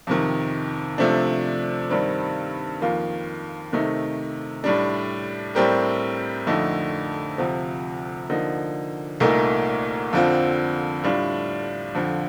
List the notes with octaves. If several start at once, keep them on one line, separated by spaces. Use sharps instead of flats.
F2 C3 D#3
C3 F3 A3 D4
G2 D#3 G3 C4
F2 D#3 A#3 F4
C3 D#3 A3 D#4
A2 G3 D4
A2 G3 C4 G4 A#4
F2 D3 A3 D#4
D2 C3 F3
D3 F3 A#3 D#4
C2 A#2 A3 D#4 A#4
F2 D3 F3 C4 F4
A2 G3 D4 F4
F2 D3 F3